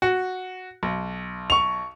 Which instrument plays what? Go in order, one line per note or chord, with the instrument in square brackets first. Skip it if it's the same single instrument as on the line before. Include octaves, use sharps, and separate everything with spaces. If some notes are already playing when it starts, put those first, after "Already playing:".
[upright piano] F#4
B1
[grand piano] C#6 F7